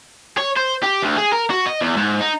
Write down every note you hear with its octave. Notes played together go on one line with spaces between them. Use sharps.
C#5
C5
G4
D2
G#4
A#4
F#4
D#5
E2
G#2
D#4